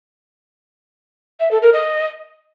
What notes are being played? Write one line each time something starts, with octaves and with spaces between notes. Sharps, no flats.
E5
A4
A#4
D#5